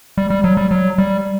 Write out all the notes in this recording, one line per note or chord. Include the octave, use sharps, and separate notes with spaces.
G3
G3
F#3
G3
F#3
G3